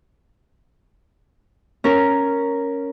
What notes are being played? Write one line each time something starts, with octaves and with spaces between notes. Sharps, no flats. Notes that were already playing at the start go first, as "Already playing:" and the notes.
C#4 A#4